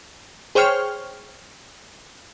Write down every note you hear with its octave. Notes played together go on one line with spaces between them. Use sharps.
G#4 C5 C#5 G5 C#6 F6